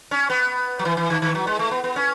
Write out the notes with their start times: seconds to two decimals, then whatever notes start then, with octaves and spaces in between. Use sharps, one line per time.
0.11 C#4
0.30 B3
0.79 F#3
0.85 E3
0.97 E3
1.10 D#3
1.22 D#3
1.35 F#3
1.47 G#3
1.59 A3
1.71 B3
1.84 B3
1.96 C#4